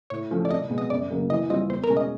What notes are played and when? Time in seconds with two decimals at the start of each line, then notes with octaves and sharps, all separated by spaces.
0.10 A2 C#5
0.31 F3 A3 C#4
0.45 D5
0.51 C2 D#5
0.70 B2 G#3 B3
0.78 D#5
0.90 F#2 D5
1.10 C#3 F#3 A#3
1.30 E3 D#5
1.50 G3 C4 F4 D#5
1.69 E2 C5
1.84 A#4
1.90 B2 G#3 C#4
1.97 D#5